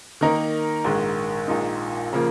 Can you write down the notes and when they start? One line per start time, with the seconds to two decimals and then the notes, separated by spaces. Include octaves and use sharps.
0.21 D#3 A#3 D#4 A#4
0.84 A#1 G#2 D#3 G#3
1.48 A#1 A#2 G#3 D#4
2.13 C#3 F3 A#3